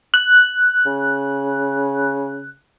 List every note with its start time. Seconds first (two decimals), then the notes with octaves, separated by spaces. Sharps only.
0.14 F#6
0.86 C#3